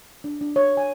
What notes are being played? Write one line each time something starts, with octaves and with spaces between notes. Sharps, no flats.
D4
D4
C#5
G#5